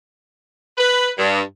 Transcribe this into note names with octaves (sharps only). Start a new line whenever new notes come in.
B4
G2